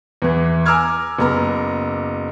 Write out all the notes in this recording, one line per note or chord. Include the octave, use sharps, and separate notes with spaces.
E2 E3
G#5 A#5 D6 E6 F6 G#6
F#1 B3 A#5